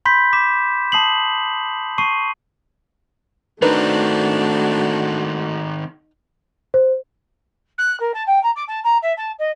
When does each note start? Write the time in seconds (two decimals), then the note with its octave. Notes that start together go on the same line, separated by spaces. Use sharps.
0.05 B5 C6 G6 B6
0.33 D6 B6 E7
0.92 A5 D#6 C7 F#7
1.98 A5 C#6 C7 D#7
3.62 D#3 A3 C4 D4 D#4 F#4 A#4 B4
6.74 C5
7.78 F#6
8.00 A#4
8.14 A5
8.26 G5
8.43 A#5
8.55 D6
8.67 A5
8.83 A#5
9.02 E5
9.17 A5
9.38 D#5